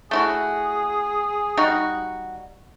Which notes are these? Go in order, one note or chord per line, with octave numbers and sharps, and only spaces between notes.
A3 E4 F#4 G#4
G3 D#4 F#4